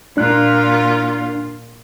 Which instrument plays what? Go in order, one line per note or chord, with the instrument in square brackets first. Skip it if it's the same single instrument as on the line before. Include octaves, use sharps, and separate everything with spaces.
[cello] A#2 F4 [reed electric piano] D4 F#6